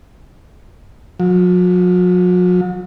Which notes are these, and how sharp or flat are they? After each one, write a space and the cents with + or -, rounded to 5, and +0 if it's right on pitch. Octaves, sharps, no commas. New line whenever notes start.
F#3 -45